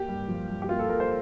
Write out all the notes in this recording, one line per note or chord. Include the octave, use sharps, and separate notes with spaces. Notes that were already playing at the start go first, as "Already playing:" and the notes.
Already playing: A#3 G4
G2
F3
G2
G4
A#3 F4
A4
G2 A#4
C5